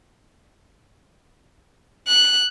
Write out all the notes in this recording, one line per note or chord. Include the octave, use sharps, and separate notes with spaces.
F#6